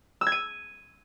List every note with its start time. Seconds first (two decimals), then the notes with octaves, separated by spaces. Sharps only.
0.21 E6
0.27 G#6
0.32 D#7